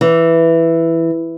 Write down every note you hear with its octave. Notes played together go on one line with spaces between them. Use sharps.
E3